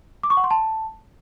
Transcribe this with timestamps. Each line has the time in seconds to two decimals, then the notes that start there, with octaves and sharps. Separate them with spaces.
0.23 D6
0.30 C#6
0.37 F#5
0.44 C6
0.51 A5